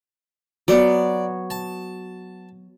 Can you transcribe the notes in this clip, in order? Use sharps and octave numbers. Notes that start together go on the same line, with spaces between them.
F#3 B3 D5
A5